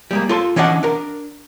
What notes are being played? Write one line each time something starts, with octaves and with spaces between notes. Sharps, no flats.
G3 G#3 A#3
F4 A4 C6
E3 C#4 D4 D#5 F5 F#5
D4 A#4